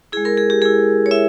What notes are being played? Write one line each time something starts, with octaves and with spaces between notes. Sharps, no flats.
G#3 E4 G#4
A#4
G#4
G4
G#3 E4 G#4
C#5
E4 E5